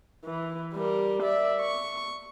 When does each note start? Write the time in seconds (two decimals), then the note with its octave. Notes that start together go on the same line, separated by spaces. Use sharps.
0.25 E3
0.73 G3 A#4
1.23 D5 E5
1.61 C#6